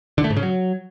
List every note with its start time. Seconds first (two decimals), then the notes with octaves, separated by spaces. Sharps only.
0.18 D3
0.24 A3
0.30 G#2
0.37 C#3
0.43 F#3